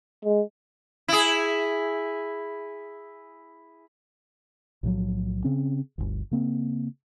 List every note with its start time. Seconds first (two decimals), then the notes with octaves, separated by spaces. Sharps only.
0.25 G#3
1.08 E4 G#4
4.83 B1 A2 F3 F#3
5.44 C#3 C4 C#4
5.98 G1 D2
6.31 C#3 A#3 C4